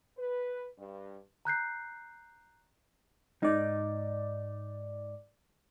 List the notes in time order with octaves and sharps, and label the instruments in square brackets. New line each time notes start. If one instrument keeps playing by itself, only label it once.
[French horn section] B4
G2
[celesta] A#5 F#6 G6 C7
[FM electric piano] G#2 D5 [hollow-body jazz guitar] D#4